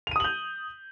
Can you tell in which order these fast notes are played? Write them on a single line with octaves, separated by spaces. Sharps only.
F7 D#7 D#6 F#7 G6